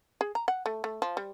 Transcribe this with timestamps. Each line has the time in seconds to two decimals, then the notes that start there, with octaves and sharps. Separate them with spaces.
0.21 G#4
0.35 A#5
0.48 F#5
0.66 A3
0.84 A3
1.02 F3
1.17 G3